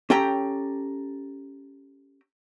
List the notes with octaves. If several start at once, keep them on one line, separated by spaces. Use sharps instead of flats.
C#4 G4 A4 G5 A#5